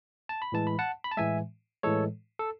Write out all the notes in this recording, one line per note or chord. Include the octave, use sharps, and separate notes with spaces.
A5
B5
A2 E3 G#3 A5
B5
F#5 A5
B5
A5
A2 E3 G#3 E5 G#5
A2 E3 G#3 A4 C#5
A4